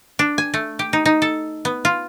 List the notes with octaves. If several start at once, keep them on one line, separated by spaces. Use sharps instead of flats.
D4
G#5
A3
G4
D#4
D#4
A4
B3
F4